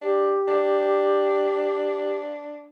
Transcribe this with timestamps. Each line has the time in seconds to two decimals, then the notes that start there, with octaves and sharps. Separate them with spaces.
0.01 D4 G4
0.48 D4